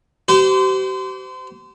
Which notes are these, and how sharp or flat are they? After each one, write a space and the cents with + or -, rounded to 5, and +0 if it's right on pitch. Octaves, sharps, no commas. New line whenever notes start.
G4 -45 C5 -30